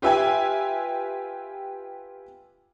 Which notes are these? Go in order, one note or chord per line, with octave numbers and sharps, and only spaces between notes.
F4 G4 B4 E5 G5 G#5